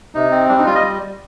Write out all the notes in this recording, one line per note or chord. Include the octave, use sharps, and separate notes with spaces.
C3 D#4
C4
G3 D4
D#4
G3 F4
D#5